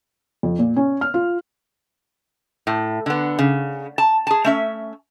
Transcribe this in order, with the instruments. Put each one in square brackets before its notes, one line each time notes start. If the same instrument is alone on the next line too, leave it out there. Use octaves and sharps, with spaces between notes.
[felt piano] F2
A#2
C#4
F6
F4
[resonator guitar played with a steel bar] A2
D3 B3
C#3
A5
G#4 A5
A3 C#4 E5